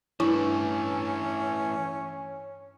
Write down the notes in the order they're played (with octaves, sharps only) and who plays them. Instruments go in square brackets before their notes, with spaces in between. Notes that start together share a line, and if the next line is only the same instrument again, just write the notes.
[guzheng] G2 [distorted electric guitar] E3 A3 [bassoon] C#4 [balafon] E4 C#6